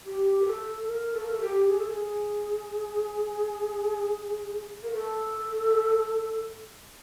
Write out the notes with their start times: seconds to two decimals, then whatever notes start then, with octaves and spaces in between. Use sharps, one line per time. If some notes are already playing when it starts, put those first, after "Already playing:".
0.06 G4
0.42 A#4
0.46 A4
0.87 A#4
1.14 A4
1.23 A#4
1.31 A4
1.41 G4
1.68 G#4
1.78 A4
1.88 G#4
4.83 A#4
4.92 A4